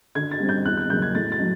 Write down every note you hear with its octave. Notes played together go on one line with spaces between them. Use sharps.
D3 G#6
A6
G3 C4
G6
E2 F#6
F#6
C#3 F#3 A#3 G6
G#6
A2 A6
A6
F#3